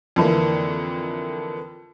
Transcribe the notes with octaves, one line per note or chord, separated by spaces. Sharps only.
F2 D3 E3 A#3